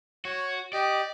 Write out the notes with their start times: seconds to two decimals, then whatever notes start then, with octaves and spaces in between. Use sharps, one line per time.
0.25 F#4 C#5
0.73 G4 D5 D#5